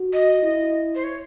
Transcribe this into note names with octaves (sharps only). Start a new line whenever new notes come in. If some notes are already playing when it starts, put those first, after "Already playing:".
Already playing: F#4
D#5
E4
C5
C#5